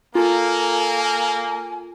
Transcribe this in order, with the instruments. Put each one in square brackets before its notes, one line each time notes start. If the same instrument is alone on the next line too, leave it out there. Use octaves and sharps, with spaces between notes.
[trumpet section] A#3 [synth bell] F4 [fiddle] A4 [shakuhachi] G#5